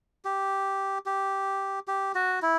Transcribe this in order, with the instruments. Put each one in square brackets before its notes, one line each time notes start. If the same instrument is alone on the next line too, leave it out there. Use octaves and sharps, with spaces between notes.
[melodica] G4
G4
G4
F#4
E4